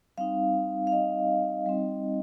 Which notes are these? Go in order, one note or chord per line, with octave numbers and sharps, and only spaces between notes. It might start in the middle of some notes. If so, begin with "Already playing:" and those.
G3 C4 D#4 F5
F5
D#5
G3 C4 D#4